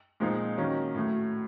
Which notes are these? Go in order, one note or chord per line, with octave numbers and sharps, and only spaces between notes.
A#2 F3 G#3 C4 D#4
D#3 F#3 A#3 C#4
A2 F#3 A3